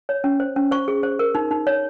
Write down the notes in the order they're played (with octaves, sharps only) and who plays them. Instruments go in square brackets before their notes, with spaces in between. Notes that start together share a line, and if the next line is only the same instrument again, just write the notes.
[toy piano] C#5
C#4
C5
C#4
C5 C#6
G#4
C5
A#4
D#4
D#4
C#5